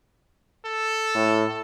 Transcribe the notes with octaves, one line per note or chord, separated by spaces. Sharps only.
A4
A2